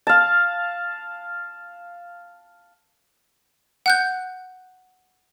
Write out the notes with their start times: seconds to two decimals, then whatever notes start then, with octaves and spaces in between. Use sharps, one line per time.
0.07 F5 A5
3.86 F#5 F#6 G6